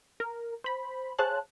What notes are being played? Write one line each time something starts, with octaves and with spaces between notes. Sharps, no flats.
A#4
C5 B5
G#4 C5 C#5 F5 A5 F#6